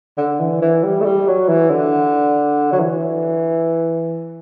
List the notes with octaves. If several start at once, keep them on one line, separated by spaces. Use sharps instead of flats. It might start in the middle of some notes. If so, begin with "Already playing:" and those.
D3
E3
E3
G3
A3
G3
F#3
E3
D3
F#3
E3